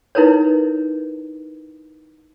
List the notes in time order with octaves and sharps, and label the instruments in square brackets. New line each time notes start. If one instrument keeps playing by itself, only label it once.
[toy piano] D#4 E4 A#4 B4 C#5